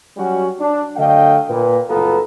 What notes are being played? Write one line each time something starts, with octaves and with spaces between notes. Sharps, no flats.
F#3 G3 C#4 F#4
D4
D3 F#3 A3 D#5 F5 G5
A#2 B4
F#1 C2 B3 F4 A4 A#5